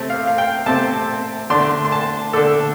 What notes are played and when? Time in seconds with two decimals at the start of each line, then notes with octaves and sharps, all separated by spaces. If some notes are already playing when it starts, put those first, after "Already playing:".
Already playing: C3 A3 C4
0.10 F5
0.27 F5
0.38 G5
0.66 C3 A3 C4 A5
1.50 D3 A3 D4 C6
1.85 C6
1.92 A5
2.33 D3 A3 D4 A4